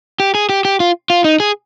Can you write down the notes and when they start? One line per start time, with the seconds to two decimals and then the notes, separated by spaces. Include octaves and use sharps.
0.20 G4
0.35 G#4
0.49 G4
0.65 G4
0.80 F4
1.10 F4
1.24 D#4
1.40 G#4